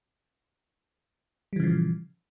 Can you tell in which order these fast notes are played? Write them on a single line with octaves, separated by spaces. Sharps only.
G3 E3 C#3 F3 A#2